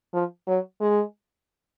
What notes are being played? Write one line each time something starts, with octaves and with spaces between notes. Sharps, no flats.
F3
F#3
G#3